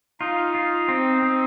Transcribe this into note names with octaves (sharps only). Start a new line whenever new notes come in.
D#4 F4
F4
C4
C4